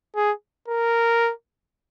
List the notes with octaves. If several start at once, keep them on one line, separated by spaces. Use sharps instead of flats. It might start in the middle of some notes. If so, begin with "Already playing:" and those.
G#4
A#4